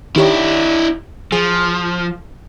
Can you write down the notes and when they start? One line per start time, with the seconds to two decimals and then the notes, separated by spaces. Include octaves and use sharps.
0.16 D#3 D4 E4 G4 C#5
1.32 F3 G#4